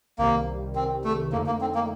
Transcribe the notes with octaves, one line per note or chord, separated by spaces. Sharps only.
C2 C3 D#3 G3 A#3
C4
A3
F2 D3 A3 A#3 D#4
A#3
C4
A#3